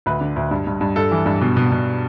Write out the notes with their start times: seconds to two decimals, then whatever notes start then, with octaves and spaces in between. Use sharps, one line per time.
0.06 D2 B4
0.21 D3
0.36 D2
0.51 G2
0.67 G2
0.81 G2
0.96 G2 A4
1.11 E3
1.26 G2
1.41 B2
1.57 B2
1.72 B2